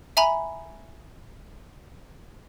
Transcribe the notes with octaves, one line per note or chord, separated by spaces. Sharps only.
E5 G#5 A#5 B5